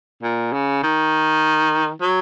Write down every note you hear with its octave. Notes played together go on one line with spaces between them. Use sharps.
A#2
C#3
D#3
F#3